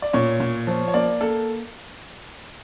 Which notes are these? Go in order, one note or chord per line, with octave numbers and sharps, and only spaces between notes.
D5
A#2 C#5
A#2
F3
C#5
A#3 D5
A#3 A4